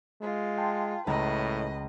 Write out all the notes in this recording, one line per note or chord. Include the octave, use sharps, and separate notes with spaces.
G#3 F4
G5 A5 C6
C#2 A2 B4 D#5 A#5 A6